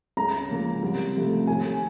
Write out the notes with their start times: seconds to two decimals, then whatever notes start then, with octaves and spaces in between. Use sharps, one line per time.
0.17 C#2 A#5
0.49 C#3 F3 A#3
0.83 C2
1.15 C3 F3 A3
1.47 D#2 G#5